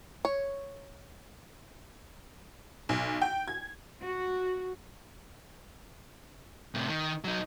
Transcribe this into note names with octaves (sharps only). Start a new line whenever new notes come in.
C#5
B1
G5
G#6
F#4
A2 C3
D#3
F#3 D#4